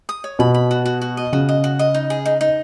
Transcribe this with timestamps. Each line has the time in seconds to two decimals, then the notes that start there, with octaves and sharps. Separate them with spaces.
0.09 D#6
0.24 C#5
0.39 B2 B5
0.54 B5
0.71 F#4
0.86 F#4
1.02 F#4
1.17 D#5
1.32 C#3 F#4
1.49 D#5
1.64 F#4
1.79 D#5
1.94 D#4
2.10 G#4
2.26 D#4
2.41 D#4